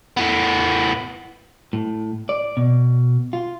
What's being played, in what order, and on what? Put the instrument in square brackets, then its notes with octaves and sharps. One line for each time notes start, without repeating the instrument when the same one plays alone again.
[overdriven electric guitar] A2 B3
[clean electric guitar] A2
D5
B2
F4